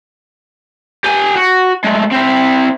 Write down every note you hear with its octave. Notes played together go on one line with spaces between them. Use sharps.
G4 G#5
F#4
G#3 A3
C4 E4